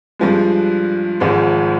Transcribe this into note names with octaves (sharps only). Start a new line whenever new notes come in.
G2 F3 G#3
G#1 G#2 F3 G#3